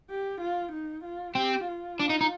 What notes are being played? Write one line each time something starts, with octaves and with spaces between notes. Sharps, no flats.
G4
F4
D#4
F4
C4 G4
F4
D4
D#4
D#4